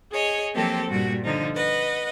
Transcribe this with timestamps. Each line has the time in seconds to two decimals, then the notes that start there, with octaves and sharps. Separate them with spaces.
0.11 G#4 C#5 D#5
0.54 F3 F#3 A#3 C4 G4 A4
0.90 G2 A#2 G3 F#4
1.24 D3 F3 D#4
1.55 B4 D#5 F#5